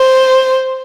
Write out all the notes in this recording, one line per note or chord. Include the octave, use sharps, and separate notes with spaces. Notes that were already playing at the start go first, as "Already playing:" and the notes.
Already playing: C5